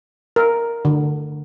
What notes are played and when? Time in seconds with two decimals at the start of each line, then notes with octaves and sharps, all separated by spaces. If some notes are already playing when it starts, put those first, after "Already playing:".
0.36 A#4
0.85 D3